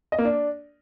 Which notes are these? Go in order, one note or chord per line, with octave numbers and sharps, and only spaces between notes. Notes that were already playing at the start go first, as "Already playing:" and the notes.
D#5
A#3
D4